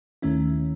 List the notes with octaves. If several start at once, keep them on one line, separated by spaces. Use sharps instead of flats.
D#2 D#3 A3 C#4 E4